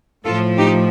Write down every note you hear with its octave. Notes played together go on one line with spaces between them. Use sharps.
A2 F3 F4 A4
D#4 G4